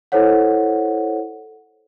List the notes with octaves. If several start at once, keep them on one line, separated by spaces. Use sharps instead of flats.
E4 A4 C5 C#5 F#5